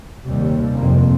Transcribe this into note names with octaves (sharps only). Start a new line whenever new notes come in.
D#2 C3 G3
F1 A#3 C4